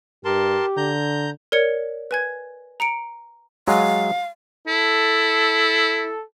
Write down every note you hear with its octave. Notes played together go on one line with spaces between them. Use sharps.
G2 G4 A#4 A5 C6
D3 A#5 G6
A#4 C#5 D5 G#6 C#7
B4 G#5 G#6
A#5 C#7 D7
F#3 G#3 F5
E4 A4